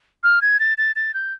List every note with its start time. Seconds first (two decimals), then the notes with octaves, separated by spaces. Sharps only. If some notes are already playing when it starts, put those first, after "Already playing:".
0.23 F6
0.42 G#6
0.60 A6
0.78 A6
0.96 A6
1.14 G6